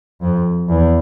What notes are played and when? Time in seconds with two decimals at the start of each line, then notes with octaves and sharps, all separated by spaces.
0.21 F2
0.69 E2